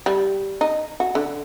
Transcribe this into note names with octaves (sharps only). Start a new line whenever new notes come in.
G3
D#4
F#4
D3